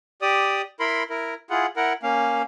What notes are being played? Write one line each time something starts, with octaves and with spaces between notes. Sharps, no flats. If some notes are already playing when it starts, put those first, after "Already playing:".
G4 D5 D#6
E4 A#4 B5 C6
E4 A#4
E4 F4 G#4 F#5
E4 A#4 F#5
A#3 C#4 F5